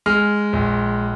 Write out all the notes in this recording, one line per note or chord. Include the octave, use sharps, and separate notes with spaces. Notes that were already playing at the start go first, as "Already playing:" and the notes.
G#3 F6
A#1